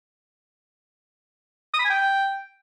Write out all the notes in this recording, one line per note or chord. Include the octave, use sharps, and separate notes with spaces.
D#6
B5
G#5
G5